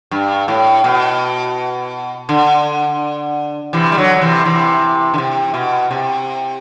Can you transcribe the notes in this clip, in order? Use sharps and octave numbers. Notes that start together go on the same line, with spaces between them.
G2
A2
B2
D3
C3 E3
G3
D3 F#3
F#3
C3 E3
C3 E3
D3
C3
B2
C3